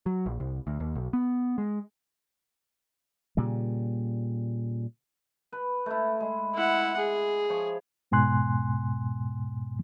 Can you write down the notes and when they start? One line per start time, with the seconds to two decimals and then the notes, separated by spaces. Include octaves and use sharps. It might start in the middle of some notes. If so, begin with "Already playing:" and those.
0.06 F#3
0.26 A#1
0.40 C2
0.67 D2
0.80 D#2
0.95 B1
1.13 B3
1.58 G#3
3.37 A#2 C#3 G3
5.52 B4
5.86 A3 E4
6.20 G#3
6.54 E4 F#5
6.97 G#4
7.49 F3 C#5
8.11 E2 G#2 B2 G#5 C6 F#6